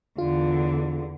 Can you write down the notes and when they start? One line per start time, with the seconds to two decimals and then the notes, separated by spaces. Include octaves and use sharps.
0.18 E2 D3 F4